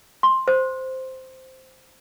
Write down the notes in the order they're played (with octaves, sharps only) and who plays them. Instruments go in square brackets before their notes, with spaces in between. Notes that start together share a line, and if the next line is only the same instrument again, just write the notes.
[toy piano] C6
C5